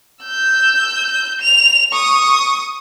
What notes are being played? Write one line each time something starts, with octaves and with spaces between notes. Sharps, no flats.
E6 G6
F7
C#6 D#6